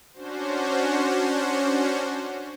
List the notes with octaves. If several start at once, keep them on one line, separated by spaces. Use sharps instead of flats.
C#4 D4 F#4 C5